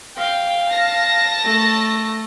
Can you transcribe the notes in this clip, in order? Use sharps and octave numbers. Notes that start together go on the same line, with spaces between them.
F5 G5
A5 A#6
A3